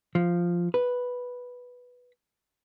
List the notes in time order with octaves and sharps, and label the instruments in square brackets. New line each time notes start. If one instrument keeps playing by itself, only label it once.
[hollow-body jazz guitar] F3
B4